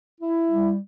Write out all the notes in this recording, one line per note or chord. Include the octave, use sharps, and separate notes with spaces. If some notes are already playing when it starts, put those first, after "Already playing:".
E4
G3